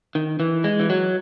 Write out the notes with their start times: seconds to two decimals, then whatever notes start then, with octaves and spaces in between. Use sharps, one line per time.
0.15 D#3
0.40 E3
0.64 G#3
0.80 E3
0.90 F#3